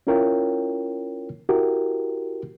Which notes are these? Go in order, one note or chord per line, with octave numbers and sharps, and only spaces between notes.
C#4 E4 F4 A#4 C#5 G5
E4 F#4 G4 A#4